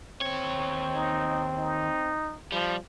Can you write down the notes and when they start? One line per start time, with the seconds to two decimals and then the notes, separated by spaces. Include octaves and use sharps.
0.21 D#2 C4 C#5
0.95 D#4
1.57 D#4
2.52 F3 G3